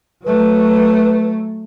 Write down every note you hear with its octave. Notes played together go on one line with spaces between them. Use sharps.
F#3 A3 B4